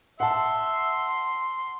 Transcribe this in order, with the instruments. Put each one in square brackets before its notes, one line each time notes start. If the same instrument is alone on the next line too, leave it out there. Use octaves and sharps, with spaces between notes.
[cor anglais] E5 [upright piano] F#5 A5 [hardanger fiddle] C6